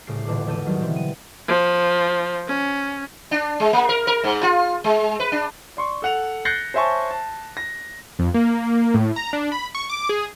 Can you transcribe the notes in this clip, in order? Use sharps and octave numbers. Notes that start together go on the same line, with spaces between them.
C2 A2 C#3 C7 D7
D#1 A1 D3 D6
G#1 E2 A4 G6 D7 D#7
D3 D#3 F#3 G3 D#4
B2 E3 C4
D#7
F3
C#4
D4
G#3
A#3
A#4
A#4
G#2
F4
G#3
B4
D4
D5 C6 C#6
A4 F#5 F7
F#6 G6 A6 A#6 C7 C#7
C5 C#5 E5 G#5 A5 C#6
A5
A#6
F2
A#3
A2
A#5
D4
B5
C#6
D6
G#4